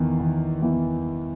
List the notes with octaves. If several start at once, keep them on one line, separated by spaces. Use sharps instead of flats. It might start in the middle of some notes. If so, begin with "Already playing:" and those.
Already playing: E2 D#3 E3
D#3
E2 E3